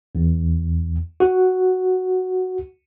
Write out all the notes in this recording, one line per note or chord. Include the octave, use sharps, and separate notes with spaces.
E2
F#4